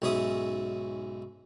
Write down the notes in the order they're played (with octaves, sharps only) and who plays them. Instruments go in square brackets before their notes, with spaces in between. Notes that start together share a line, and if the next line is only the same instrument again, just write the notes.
[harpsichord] B1 G#2 C#4 G#4 E5 D#6